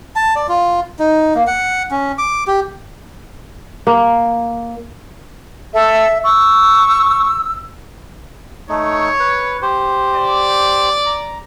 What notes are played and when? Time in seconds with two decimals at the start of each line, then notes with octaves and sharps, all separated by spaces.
0.16 A5
0.36 D5
0.49 F4
0.99 D#4
1.35 A#3
1.47 F#5
1.91 C#4
2.18 D6
2.47 G4
3.87 A#3
5.74 A4 E5
6.24 C#6 E6
8.69 A3 D#4 C#5
9.20 B4
9.62 G4 C5
10.15 D5
11.06 A#5